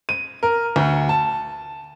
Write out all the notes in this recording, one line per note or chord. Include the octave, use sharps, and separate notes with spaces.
D#7
A#4
D2
A5